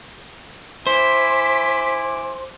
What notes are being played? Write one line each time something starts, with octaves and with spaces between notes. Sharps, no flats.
E4 C5 G#5 D6 B6